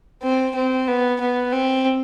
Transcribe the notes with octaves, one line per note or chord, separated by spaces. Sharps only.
C4
C4
B3
B3
C4